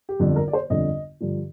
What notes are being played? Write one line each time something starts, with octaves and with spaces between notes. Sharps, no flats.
G4
G1 F2 D3 A4
A#4
D5
C5
G1 F2 D3 D#5
G2 D3 F3